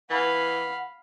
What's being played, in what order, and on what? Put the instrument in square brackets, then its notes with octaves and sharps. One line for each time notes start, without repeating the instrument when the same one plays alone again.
[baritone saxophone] E3 [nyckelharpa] F5 B5 [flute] F#5